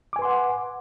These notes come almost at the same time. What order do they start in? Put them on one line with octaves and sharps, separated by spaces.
D6 G#5 B4 C6 F#5